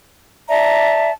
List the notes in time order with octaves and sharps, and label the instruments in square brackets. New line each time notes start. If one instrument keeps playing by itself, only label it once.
[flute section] D5 E5 A5 A#5